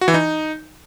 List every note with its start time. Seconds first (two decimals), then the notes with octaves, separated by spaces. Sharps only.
0.01 F#4
0.08 E3
0.14 D#4